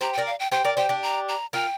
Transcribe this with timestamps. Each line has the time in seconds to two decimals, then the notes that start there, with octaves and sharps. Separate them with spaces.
0.01 G4 C5 A#5
0.13 G5
0.18 A#4 D5
0.27 F5
0.40 G5
0.52 G4 C5 G5
0.65 A#4 D5
0.77 G4 C5 G5
0.89 D4 G4
1.03 A#5
1.28 A#5
1.53 F4 A#4 G5